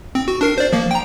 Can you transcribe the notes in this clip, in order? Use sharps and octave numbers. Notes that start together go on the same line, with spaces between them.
C4
F#4
D4 A#4 C7
C5 D5
F3 A#3
G5 A#5